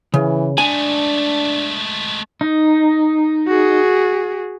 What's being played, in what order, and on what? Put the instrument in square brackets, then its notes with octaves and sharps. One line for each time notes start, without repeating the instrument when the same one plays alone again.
[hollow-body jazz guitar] C#3 [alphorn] E3
[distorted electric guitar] G#3 A3 [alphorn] D4 [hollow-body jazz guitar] G#5
[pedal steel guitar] D#4
[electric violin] F#4 G#4